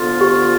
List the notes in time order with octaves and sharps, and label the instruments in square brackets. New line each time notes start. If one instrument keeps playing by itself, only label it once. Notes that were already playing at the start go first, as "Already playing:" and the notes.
Already playing: [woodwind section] D2 D3 F3 B3 F4
[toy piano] G4